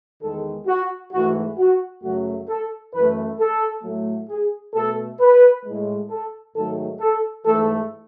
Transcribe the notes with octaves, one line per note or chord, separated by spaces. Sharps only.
E2 D#3 G#3 A4
F#4
G#2 E3 A3 F#4
F#4
F#2 C#3 F#3 A3 F#4
A4
F#2 E3 A3 B4
A4
A2 F#3 A3
G#4
B2 A3 A4
B4
A2 G#3
A4
G#2 D#3 F#3 A3 A4
A4
G#2 E3 A3 A4